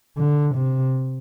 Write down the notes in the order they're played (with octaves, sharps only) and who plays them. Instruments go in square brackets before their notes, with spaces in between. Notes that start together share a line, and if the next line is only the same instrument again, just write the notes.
[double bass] D3
C3